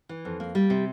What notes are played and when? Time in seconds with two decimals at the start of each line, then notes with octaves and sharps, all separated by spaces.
0.09 E3
0.25 F2
0.40 A#3
0.55 G3
0.70 C3